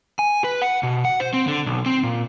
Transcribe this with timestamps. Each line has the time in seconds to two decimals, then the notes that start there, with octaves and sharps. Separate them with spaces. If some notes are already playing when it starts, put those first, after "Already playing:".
0.19 G#5
0.44 B4
0.62 F#5
0.83 B2
1.05 F#5
1.20 C5
1.34 C4
1.48 D3
1.66 B1
1.86 C4
2.03 A#2